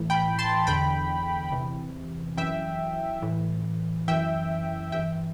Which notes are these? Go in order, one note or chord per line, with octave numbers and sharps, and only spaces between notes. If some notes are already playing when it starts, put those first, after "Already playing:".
Already playing: A2 E3
G5 B5
A5 C6
E2 D3 G5 B5
E2 C3 E3
F#2 E3 E5 G5
A2 E3
F#2 E3 E5 G5
G2 E3 E5 G5